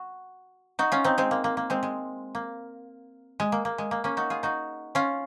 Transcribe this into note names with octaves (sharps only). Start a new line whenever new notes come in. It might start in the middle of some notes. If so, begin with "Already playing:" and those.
Already playing: F#4
D#4 F#4
C#4 F4
C4 D#4
G#3 C4
A#3
A#3
A#3
G#3 C4
G#3
A#3
G#3
A#3
A#3
G#3
A#3
A#3 C#4
D#4 F#4
F4 G#4
D#4 F#4
C#4 F4